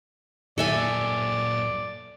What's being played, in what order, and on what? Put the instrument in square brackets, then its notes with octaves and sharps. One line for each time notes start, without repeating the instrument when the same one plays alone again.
[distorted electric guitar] A#2 F#3 [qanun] A4 E5 G#5 [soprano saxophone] D5